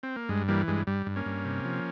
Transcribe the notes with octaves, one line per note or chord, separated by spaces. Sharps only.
C4
A#3
G2 G#3
E3 G3 A#3
G2 G#3
G2 G3
G2
A#3 C#4
G2
C3
F3